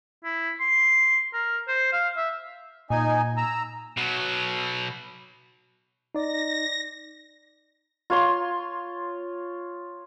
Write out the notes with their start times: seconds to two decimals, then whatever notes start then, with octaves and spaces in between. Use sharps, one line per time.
0.25 E4
0.61 C6
1.34 A#4
1.68 C5
1.93 F5
2.17 E5
2.90 A#2 D#4 G#5
3.37 A#5 E6
3.97 B2 F#3
6.15 D#4 D5 A#6
8.10 F4 C#5 C6